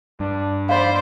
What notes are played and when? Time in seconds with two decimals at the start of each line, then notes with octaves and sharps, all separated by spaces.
0.20 G2 D4
0.69 C5 D5 D#5 F5 B5